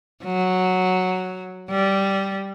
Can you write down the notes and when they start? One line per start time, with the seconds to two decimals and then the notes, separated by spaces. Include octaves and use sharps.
0.24 F#3
1.70 G3